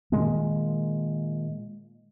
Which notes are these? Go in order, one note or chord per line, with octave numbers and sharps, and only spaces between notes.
A#2 D#3 G#3 A#3